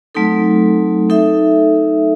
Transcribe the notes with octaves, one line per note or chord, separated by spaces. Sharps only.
F#3 A3 C4 D#4 A4
D#4 A4 E5